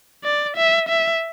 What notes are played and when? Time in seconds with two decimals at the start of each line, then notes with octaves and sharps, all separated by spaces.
0.24 D5
0.56 E5
0.89 E5